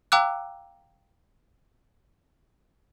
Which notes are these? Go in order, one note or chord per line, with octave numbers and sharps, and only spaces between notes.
F5 G5 A#5 D6 E6 F#6